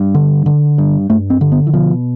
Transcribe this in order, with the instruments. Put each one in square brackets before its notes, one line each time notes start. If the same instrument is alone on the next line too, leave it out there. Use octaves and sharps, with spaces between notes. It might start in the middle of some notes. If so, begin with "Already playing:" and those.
Already playing: [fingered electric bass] G2
D3
D3
G2
G2 A3
C4
D3
B3
E3
B2 F3